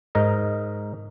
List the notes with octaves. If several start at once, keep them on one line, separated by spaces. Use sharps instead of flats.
G#2 D#4 A#4 D#5